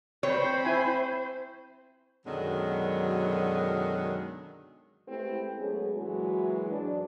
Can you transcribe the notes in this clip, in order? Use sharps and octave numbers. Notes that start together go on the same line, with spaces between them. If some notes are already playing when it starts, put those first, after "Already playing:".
C4 C5 C#5 B5
E4 G#5
F#2 B2 D3 D#3 F#3 G#3
G#3 A3 B3 C4 E4 G4
F#3 G#3 A3 B3 C#4 G#4
A#2 E3 F#3 G#3 E4 F#4
G#2 E3 F#3 D4